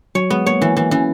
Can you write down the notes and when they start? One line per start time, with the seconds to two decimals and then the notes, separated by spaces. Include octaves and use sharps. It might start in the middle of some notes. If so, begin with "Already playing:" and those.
0.15 F#3 C#5
0.30 G#3 B3
0.46 A#3 C#5
0.61 E3 A#3
0.77 E3 A#3
0.91 E3 C#4